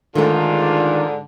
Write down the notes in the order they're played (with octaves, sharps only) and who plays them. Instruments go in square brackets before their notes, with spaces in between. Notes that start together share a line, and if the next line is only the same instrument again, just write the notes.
[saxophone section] G#2 D3 [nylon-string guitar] D#3 A3 [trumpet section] D4 F4